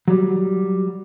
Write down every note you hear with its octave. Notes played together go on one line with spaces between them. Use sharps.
F#3 G3